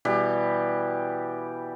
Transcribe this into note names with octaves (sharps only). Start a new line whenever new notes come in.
B2 E3 G3 G4